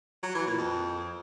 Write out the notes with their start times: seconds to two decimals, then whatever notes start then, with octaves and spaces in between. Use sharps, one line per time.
0.23 F#3
0.35 E3
0.46 A#2
0.58 F2